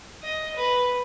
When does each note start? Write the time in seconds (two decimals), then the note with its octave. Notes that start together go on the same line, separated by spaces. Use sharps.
0.23 D#5
0.56 B4